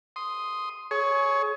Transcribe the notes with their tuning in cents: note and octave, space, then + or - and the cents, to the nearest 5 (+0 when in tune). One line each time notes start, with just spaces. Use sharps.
C6 +0 D#6 +5
G#4 +35 C#5 +0 G#5 +30